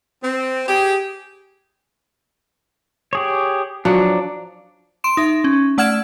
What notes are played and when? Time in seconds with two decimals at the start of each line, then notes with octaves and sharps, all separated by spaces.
0.23 C4
0.68 G4 G#4
3.13 G4 G#4 C#5
3.85 F3 F#3 D4 F#5
5.04 C6 D7 E7
5.17 D#4 E5
5.44 C#4
5.78 A3 D5 F#5 F6 G#6 E7